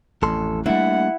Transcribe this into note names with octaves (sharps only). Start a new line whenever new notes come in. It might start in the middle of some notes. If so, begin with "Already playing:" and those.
A1 F2 A4 C6
G3 A3 A#3 D4 E4 F#5